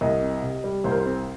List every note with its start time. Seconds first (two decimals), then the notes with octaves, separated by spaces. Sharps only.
0.01 C2 D#5
0.21 C4
0.42 C3
0.64 G3
0.84 C2 C5
0.92 A#4
1.00 C5
1.05 C4